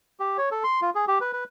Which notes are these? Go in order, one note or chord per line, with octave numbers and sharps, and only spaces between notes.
G4
C#5
A4
C6
F4
G#4
G4
B4
B4